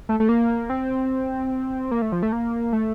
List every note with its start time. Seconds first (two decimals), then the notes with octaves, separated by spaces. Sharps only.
0.09 A3
0.20 A3
0.29 A#3
0.70 C4
1.91 A#3
2.02 A3
2.12 F3
2.23 A3
2.32 A#3
2.73 A3